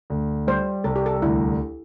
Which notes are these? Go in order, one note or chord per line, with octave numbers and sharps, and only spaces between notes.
D2
G3 C5
C2 A4
G4
A4
D2 E4